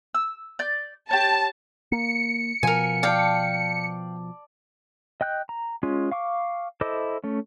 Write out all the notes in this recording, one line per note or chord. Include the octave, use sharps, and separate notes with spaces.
E6
D5 G6
G4 C#5 A5
A#3 C#7
B2 F3 A#4 G#5
D5 F5 G5 A5
D#5 G5 F#6 G6
A#5
G#3 C#4 F4
F5 C#6 D6
E4 A4 C5 D#5 D6
A3 C#4